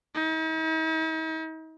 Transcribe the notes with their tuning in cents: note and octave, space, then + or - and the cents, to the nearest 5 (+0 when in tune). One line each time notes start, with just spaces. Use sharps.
D#4 +45